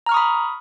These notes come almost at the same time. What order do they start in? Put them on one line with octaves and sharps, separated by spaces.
A#5 F6 C#6 D#6 B5